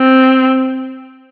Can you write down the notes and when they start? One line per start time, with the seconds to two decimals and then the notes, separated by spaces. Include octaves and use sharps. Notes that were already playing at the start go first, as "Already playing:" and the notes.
Already playing: C4